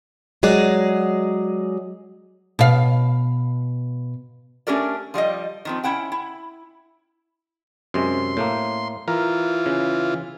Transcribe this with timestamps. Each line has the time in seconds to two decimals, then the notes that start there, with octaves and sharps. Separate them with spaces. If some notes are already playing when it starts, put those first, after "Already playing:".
0.43 F#3 G#3 G#4 D5
2.59 B2 F5
4.67 A3 C#4 D4 G4 A#4 D5
5.14 F3 G3 D5 D#5
5.65 D#3 F3 C4
5.84 C#4 E4 F#5 G5
6.12 E4
7.94 F#2 C3 G#3 C6
8.37 A2 A3 A#3
9.08 E3 F4 A#4
9.66 C#3